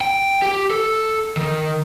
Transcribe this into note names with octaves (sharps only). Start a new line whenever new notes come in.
G5
G4
A4
D#3